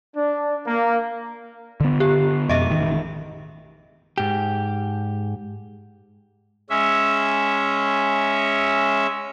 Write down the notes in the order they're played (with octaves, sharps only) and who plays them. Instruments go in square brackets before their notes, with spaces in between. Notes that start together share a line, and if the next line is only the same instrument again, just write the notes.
[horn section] D4
A#3
[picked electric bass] D3 B3
[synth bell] G4
[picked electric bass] F2 B2 [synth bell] D#5 E5
[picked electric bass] A1 D#3
[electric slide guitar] G#2 G4
[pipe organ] G#3 C#4 E5